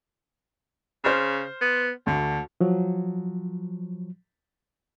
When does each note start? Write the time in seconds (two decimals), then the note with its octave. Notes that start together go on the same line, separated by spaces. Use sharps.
1.04 C#3 C5 F6
1.61 B3
2.07 D2 D3
2.61 F3 F#3